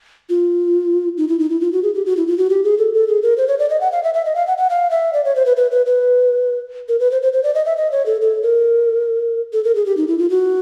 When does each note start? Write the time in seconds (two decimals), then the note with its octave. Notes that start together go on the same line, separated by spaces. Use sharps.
0.30 F4
1.18 D#4
1.29 E4
1.39 D#4
1.50 E4
1.61 F4
1.73 F#4
1.83 G#4
1.95 G4
2.06 F#4
2.17 E4
2.27 F4
2.38 F#4
2.50 G4
2.64 G#4
2.78 A4
2.94 A4
3.08 G#4
3.23 A#4
3.38 C5
3.48 C#5
3.59 D5
3.70 D#5
3.81 F#5
3.92 F5
4.03 E5
4.14 E5
4.25 D#5
4.36 F5
4.47 F#5
4.58 F#5
4.70 F5
4.91 E5
5.13 D5
5.25 C#5
5.36 C5
5.46 B4
5.57 B4
5.71 B4
5.86 B4
6.89 A#4
7.00 B4
7.12 C5
7.22 C5
7.33 C5
7.44 D5
7.55 D#5
7.66 E5
7.77 D#5
7.92 C#5
8.06 A4
8.21 A4
8.43 A#4
9.53 A4
9.64 A#4
9.75 G#4
9.86 G4
9.97 D#4
10.08 E4
10.19 F4
10.30 F#4